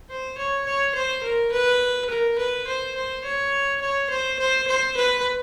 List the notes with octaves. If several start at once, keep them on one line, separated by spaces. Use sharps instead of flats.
C5
C#5
C#5
C5
A#4
B4
A#4
B4
C5
C5
C#5
C#5
C5
C5
C5
B4